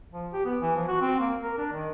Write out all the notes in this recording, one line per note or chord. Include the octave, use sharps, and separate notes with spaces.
F3
G4
B3
E3
F3
F#4
C4
A#3
A#4
D4
D#3